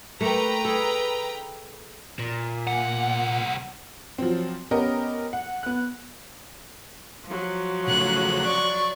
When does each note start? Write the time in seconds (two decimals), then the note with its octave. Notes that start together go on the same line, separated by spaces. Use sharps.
0.21 A3 A#3 B4 G5 A#5
0.65 G#4 A4
2.19 A#2
2.67 C2 F#5
4.18 F3 F#3 C4
4.71 B3 C#4 G4 A#4 D#5
5.33 F#5
5.63 B3 F#6
7.26 F3 F#3
7.88 C#3 A3 F#6
8.45 D5 C#6